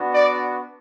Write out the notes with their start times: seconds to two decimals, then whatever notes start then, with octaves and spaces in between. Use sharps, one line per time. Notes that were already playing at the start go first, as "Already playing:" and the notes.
Already playing: B3 D4 F#4
0.13 D5